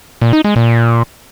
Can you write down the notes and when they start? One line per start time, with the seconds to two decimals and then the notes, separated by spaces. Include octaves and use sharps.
0.22 A#2
0.33 D#4
0.44 G#3
0.56 A#2